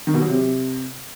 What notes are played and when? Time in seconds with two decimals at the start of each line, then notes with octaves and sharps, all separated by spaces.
0.07 D#3
0.14 B2
0.21 F#3
0.28 C3